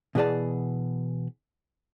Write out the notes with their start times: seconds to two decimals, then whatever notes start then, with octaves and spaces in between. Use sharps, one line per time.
0.15 B2 E3 B3 G#4 D5 A5